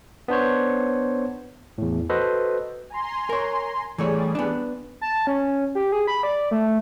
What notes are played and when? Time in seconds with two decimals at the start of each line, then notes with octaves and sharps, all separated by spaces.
0.28 B3 D4 C5 C#5
1.78 E2 A2
2.09 F#4 A4 B4 C5 D#5
2.90 G#5 A#5 C6
3.30 A#4 C#5
3.98 E3 G3 A3 G#4 C#5 D5
4.35 B3 D4
5.01 A5
5.27 C#4
5.75 G4
5.92 G#4
6.07 B5
6.23 D5
6.51 A3